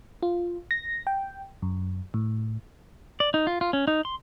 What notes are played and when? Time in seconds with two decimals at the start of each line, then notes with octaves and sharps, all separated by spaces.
0.23 F4
0.71 A#6
1.07 G5
1.62 F#2
2.14 A2
3.20 D5
3.34 D#4
3.47 F4
3.61 F4
3.73 C#4
3.87 D#4
4.05 C6